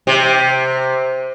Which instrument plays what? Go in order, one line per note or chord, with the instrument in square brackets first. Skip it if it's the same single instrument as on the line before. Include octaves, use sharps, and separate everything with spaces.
[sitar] C3